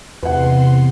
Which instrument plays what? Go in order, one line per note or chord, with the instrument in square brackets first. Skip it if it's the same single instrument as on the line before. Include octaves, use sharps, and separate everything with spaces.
[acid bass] E2 [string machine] C3 C6 [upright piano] B4 F#5